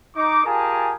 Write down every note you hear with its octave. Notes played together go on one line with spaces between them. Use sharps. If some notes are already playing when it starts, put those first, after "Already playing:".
D#4 D6
F4 G4 G#4 A#4 G#5 A5